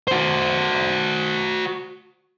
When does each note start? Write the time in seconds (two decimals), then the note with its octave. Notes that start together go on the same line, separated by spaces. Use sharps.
0.08 F#4 C5